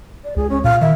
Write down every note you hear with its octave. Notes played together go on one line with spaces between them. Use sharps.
D5
C#2 G#4
C#4
A#2 F5
D#3 E5